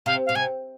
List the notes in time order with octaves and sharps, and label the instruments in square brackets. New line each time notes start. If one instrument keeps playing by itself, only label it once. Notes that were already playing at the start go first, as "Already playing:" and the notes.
[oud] C3 [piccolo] F5
[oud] B2 [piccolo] F5
[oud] C3 [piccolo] G#5